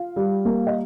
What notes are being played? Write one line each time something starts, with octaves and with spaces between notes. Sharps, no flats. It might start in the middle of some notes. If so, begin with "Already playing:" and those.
Already playing: F4 F5
G3
A#3
D#5